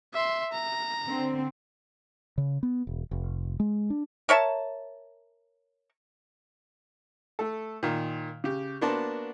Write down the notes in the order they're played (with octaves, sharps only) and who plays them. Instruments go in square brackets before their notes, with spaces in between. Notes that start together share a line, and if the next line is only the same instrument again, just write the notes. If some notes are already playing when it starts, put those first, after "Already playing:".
[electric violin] E5 C6
A#5
[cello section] D3 C4
[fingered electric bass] C#3
B3
E1
F1
G#3
D4
[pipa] A#4 C#5 E5 A5
[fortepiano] A3 A4
A#2 D#3
C#3 G4
A#3 B3 D4 F#4 C5 A5